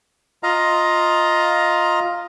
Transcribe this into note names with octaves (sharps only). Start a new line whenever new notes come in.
F4 D#5 F5 A#5